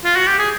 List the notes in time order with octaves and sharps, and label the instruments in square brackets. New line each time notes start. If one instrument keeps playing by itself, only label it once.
[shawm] F4
F#4
G4
G#4